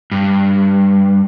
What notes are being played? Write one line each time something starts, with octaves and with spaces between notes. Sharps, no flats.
G2